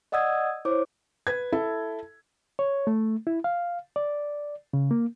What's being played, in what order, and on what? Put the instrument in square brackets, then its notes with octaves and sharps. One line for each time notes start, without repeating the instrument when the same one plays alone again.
[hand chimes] D5 D#5 F#5 D#6 E6 G#6
E4 C5 C#5 D6
[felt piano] B4 G#6
E4 A4
[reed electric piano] C#5
A3
E4
F5
D5
C#3
A#3